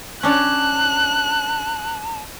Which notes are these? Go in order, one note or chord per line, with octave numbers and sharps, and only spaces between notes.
C#4 D4 C#5 A5 F#6